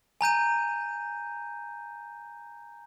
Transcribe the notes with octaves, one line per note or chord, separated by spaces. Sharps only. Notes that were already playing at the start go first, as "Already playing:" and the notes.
G#5 A#5 G6 D#7